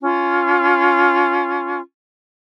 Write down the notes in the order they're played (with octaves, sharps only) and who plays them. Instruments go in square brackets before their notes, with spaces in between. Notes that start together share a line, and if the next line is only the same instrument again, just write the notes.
[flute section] C#4 F4